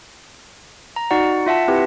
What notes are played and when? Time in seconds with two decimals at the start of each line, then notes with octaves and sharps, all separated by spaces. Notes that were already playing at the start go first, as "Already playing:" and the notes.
0.96 A#5
1.11 D#4 F#4 D5 F#5
1.46 F4 E5 F#5 A5 B6
1.68 C4 E4 G4 B4